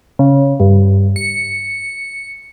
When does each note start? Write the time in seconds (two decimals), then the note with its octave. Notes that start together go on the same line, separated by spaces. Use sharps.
0.19 C#3
0.60 G2
1.16 C#7